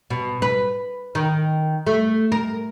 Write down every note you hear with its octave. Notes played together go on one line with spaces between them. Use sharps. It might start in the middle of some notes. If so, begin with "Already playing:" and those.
B2
B4
D#3
A3
A#4